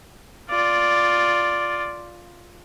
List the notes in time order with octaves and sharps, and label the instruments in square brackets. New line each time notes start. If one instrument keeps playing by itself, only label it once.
[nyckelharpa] F4 D5